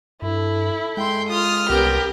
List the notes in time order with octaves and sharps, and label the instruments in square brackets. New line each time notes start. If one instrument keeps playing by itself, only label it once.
[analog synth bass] G2 [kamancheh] E4 [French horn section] A4
[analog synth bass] G#3 [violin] G5 C6
[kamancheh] F4 [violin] D#6 F6
[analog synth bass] C2 [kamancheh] B3 A#4 [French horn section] C#4 [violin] G4